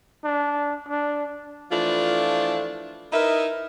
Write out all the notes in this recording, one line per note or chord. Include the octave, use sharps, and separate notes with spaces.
D4
D4
E3 F3 A3 D4 F4
D#4 E4 A#4 B4 D#5 E5